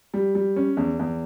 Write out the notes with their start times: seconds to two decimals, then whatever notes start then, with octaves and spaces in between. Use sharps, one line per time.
0.14 G3
0.35 G3
0.56 C#4
0.77 E2
0.99 E2